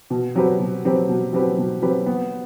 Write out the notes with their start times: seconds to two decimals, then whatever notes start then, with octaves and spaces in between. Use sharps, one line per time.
0.10 B2
0.35 F#3 C4 G4 B4
0.59 B2
0.85 F#3 C4 G4 B4
1.09 B2
1.33 F#3 C4 G4 B4
1.58 B2
1.82 F#3 C4 G4 B4
2.06 B3